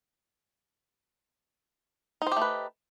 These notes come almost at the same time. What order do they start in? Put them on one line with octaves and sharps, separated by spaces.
D#4 C5 G4 A3 B4